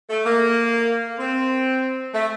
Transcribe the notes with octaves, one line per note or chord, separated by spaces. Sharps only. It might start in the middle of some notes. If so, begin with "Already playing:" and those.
A3
A#3
C4
A3